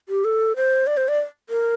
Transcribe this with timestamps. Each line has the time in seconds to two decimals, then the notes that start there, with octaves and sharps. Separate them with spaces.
0.09 G4
0.25 A4
0.56 C5
0.87 D5
0.97 C5
1.08 D5
1.49 A#4